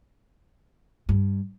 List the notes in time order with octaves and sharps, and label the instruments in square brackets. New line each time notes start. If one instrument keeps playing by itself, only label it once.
[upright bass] G2